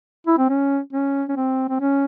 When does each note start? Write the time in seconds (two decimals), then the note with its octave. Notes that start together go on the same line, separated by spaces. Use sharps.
0.27 E4
0.38 C4
0.49 C#4
0.93 C#4
1.29 C#4
1.36 C4
1.69 C4
1.80 C#4